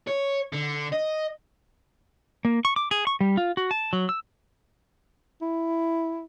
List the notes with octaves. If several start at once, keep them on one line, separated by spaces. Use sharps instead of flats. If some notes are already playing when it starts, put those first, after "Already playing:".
C#5
D3
D#5
A#3
C#6
D6
G#4
C#6
G3
F4
F#4
A5
F#3
E6
E4